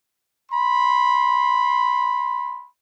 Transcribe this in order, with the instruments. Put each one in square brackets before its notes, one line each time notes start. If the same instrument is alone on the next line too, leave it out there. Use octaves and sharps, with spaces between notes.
[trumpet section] B5 C6